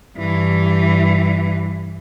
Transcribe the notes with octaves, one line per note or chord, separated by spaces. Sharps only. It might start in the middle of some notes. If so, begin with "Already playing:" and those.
G2 E3